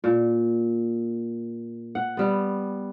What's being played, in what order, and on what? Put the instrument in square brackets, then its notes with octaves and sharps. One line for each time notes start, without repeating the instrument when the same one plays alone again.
[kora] A#2
F#5
G3 B3